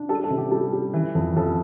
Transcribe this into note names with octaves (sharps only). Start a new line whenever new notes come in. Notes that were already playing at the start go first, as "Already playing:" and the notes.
Already playing: D4
G3 A4
A4
C3
G4
G3 A4
G3
E3
F2
F2 A4